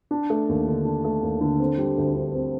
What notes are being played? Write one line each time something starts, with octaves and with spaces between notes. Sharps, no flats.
D4
A3
D#2
D3
D4
A3
D#2
D3
C4
G3
D2
D3
C4